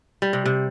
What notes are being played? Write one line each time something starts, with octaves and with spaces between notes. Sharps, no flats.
G3
C3
C3